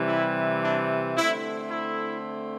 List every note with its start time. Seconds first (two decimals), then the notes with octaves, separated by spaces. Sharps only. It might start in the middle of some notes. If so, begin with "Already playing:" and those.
Already playing: C3 E3 G3
0.09 E4
0.63 D4
1.17 D3 A3 C4 E4
1.70 E4